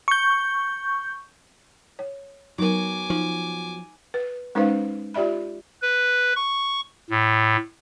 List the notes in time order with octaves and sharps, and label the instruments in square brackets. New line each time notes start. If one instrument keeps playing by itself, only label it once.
[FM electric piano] C#6 G6
[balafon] C#5
[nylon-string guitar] F#3 B3 [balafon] D#4 A#4 [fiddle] G#5 D6
[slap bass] F3 [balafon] D#4
[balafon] B4
G#3 C#4 D#4 B4 C5 F5
F4 G4 D5 E5 B5
[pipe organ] B4
C#6
A2